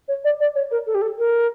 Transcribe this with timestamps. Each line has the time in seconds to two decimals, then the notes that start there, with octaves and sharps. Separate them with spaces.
0.08 C#5
0.24 D5
0.40 D5
0.55 C#5
0.71 A#4
0.87 A4
0.95 G4
1.02 A4
1.18 A#4